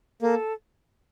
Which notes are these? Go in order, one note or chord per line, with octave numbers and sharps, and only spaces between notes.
A#3 A4